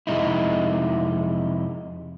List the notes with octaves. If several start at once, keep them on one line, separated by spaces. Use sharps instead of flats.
F2 C3 G#3 D#4 E4